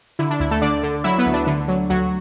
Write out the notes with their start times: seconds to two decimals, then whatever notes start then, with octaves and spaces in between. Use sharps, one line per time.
0.19 D3 E4
0.31 D4
0.40 D2 E4
0.51 A3 A4
0.62 D3 D4 D5
0.83 D3
1.04 F#3 E4 E5
1.18 B3 B4
1.26 D2
1.33 D4
1.47 D3
1.68 F#3
1.90 D2 F#3 F#4